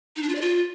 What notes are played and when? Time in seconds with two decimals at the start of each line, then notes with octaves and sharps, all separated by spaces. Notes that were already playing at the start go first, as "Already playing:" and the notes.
0.16 D#4
0.23 D4
0.29 F4
0.35 D5
0.42 F4